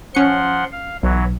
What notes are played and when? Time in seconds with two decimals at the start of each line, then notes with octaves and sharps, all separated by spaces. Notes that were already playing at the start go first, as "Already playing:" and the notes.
0.15 F3 C#4 F#5 C6 C#7
0.71 F5
1.03 B1 E3 F#3